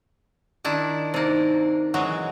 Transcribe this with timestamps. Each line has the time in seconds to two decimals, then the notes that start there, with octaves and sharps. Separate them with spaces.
0.64 D#3 D4 E4
1.14 C3 A#3 D#4 C5
1.94 E3 F#3 G#3 F#5